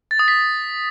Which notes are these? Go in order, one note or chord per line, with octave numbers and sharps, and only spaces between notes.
A6
D#6
B6